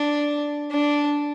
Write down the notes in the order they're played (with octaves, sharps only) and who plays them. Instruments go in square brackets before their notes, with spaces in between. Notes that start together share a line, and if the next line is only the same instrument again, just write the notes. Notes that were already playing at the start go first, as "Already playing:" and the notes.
Already playing: [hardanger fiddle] D4
D4